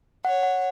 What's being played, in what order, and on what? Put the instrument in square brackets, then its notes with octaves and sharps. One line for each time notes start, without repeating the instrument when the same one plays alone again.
[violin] C#5 [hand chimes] F#5
[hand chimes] F#5